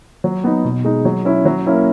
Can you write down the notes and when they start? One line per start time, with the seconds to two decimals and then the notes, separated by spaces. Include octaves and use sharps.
0.24 F#3
0.44 B3 D#4
0.65 B2
0.85 G#3 D#4
1.05 F#3
1.25 C#4 E4
1.45 F#3
1.66 A#3 C#4 E4